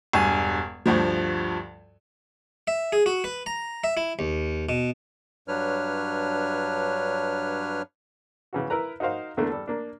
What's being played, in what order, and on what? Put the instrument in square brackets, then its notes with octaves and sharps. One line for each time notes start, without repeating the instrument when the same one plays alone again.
[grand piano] E1 G2 G#5
D2 G2 F3
[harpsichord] E5
G#4
F#4
B4
A#5
E5
E4
D#2
B2
[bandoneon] G2 F#3 D4 B4 C#5 F6
[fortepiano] C#3 E3 F#4
E4 A#4 B4 A#5
D#4 F#4 A#4 C5 F5
E2 D3 A3 A#3 D4
G3 A4
A#3 D4